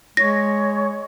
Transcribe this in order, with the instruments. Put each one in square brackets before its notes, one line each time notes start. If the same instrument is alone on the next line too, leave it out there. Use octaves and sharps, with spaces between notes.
[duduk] G#3 [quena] C#5 [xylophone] A#6